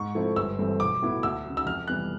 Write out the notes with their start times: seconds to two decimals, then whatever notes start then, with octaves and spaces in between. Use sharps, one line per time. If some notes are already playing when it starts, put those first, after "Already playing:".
Already playing: G#2 C#6
0.15 F3 A3 C4 E4
0.36 G1 E6
0.59 G2 E3 A3 C4
0.80 B1 D6
1.02 A2 F#3 B3 E4
1.23 D2 E6
1.45 C#3 F#3
1.57 E6
1.66 F2 F6
1.87 C3 E3 G3 B3 F#6